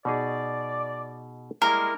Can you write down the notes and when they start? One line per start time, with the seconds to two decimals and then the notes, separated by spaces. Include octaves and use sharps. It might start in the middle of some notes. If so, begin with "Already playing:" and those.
0.05 B2 D#4 G#4 D5
1.62 G3 G#3 A#3 E4 A#4